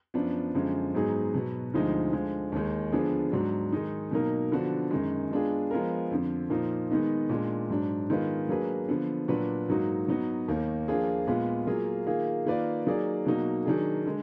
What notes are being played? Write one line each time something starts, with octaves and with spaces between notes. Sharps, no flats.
F#2 F3 B3 D4
F#2 D3 F3 G#3
G#2 F#3 B3 D#4 G#4
B2 F#3 B3
D2 D3 F3 G#3 D#4
D3 F3 G#3
D#2 D#3 G#3
D3 F3 B3 D4 G#4
G#2 F#3 D4 F#4
D#3 G#3 D#4
B2 F#3 A#3 D#4 A#4
D3 F3 B3 D4 F#4
F#2 D#3 G#3
G#3 B3 D4 F4 G#4
F3 G#3 B3 F4 A#4
F2 D3 F3
A#2 F3 A#3 D#4
D#3 G#3 B3 D#4
A#2 G#3 D4
G#2 F#3 D4
D#3 G#3 B3 F4 B4
F#3 A#3 D4 G#4 B4
D3 F3 B3
A#2 F#3 D4 F#4 B4
G#2 F#3 A#3 D#4 F#4
F#3 B3 D#4 F#4
D#2 D#3 A#3
F3 A#3 D4 F4 G#4
A#2 G#3 B3 F4 B4
F#3 A#3 F4 G#4
D#3 A#3 F4 G#4
D#3 A#3 F4 B4 D5
F#3 A#3 D#4 G#4 D5
B2 F#3 A#3 D#4 F#4
D#3 F#3 D4 G#4
D3 G#3